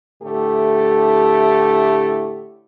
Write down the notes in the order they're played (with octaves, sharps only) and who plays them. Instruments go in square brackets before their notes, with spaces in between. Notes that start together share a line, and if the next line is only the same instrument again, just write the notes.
[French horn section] A2 D3 A3 E4 G4